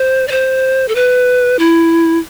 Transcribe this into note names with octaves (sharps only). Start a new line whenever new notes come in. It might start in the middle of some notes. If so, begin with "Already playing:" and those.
Already playing: C5
D5
C5
A4
B4
E4